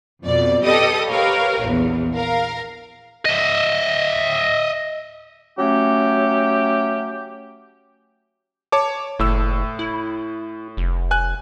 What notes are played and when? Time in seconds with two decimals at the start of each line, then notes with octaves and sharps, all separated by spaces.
0.23 F2 B2 D5
0.62 G4 A4 B4 D#5 D#6
1.08 G4 A#4 B4 C#5 F5
1.63 A#1 E2
2.14 A#4 F5
3.25 D#5 E5
5.58 F#3 A3 C#4 G4
8.72 C#5 A5 D6
9.19 F#1 A2 E6
9.79 E4
10.77 F1
11.11 G#5 F#6